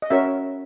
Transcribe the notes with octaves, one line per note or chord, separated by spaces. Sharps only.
D#5
C#4 F#4 A#4 C#5 E5